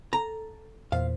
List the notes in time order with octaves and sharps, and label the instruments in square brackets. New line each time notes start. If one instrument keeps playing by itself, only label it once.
[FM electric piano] A4 [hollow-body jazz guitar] A#5
[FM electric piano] E2 A#2 C5 [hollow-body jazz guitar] F5